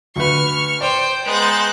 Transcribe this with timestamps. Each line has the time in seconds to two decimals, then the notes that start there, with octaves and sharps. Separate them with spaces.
0.16 D2 B4 C#6 F6
0.81 C5 D5 G5
1.26 G#3 B3 C5 A#5 F#6 G6 A6